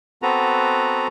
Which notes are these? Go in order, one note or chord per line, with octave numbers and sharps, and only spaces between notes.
B3 C4 F#4 A4 B4 A#5